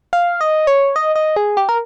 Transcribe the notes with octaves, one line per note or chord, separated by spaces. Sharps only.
F5
D#5
C#5
D#5
D#5
G#4
G4
A#4